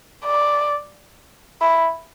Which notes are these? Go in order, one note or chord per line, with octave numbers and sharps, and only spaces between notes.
D5
E4